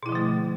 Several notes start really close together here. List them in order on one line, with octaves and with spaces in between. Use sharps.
B2 E4 F3 D3 A3